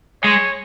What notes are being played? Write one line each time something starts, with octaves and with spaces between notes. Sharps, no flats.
G#3 C#5